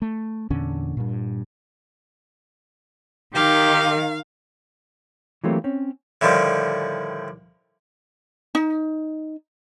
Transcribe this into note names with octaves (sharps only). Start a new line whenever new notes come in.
A3
E2 A#2 D3 C#4
G2 A#2
D#3 G4 F5
E3 F#3 A3 A#3 C4 G4
C4 C#4
A2 D3 D#3 F3 G3
D#4